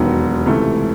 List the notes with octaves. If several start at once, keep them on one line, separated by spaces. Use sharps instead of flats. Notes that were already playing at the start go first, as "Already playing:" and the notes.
Already playing: E1 D#2 D#3 F#3 B3
C#2 C3 E3 A3